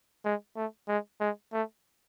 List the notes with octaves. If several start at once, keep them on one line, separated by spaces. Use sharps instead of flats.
G#3
A3
G#3
G#3
A3